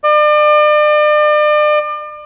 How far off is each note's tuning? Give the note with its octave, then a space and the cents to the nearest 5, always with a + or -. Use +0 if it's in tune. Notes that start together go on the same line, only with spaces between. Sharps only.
D5 +40